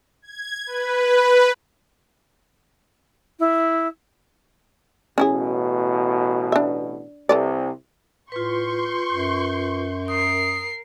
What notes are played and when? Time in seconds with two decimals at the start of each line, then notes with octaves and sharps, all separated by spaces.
0.22 G#6
0.66 B4
3.39 E4
5.18 A1 B2 C#4 E4 G#4
6.52 D4 E5
7.29 C2 C3 A4 B4 D5
8.32 A2 F4 B4 C6 C#6 G6
9.12 F#2
10.08 A#4 D#6 C7